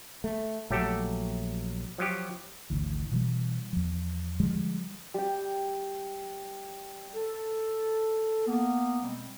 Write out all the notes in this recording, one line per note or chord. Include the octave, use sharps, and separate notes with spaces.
A3
A#1 F#3 A3 G4 A4
F3 F#3 G4
G#1 D2 E3
B2 E3 G3
E2 F3
D3 F3 G3 G#3
G3 G5
A4
A#3 B3
B2 G3 G#3 C4